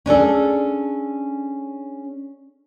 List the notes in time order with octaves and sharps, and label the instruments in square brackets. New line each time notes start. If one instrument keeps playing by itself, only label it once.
[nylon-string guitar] C#4 D4 G#4 A4